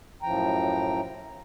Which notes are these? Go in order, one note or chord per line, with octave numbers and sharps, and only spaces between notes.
F#2 A2 F3 G5 A#5